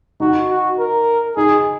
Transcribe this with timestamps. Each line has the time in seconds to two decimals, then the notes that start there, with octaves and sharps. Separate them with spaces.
0.20 D#4 F#4
0.50 F#4
0.79 A#4
1.37 D#4 G#4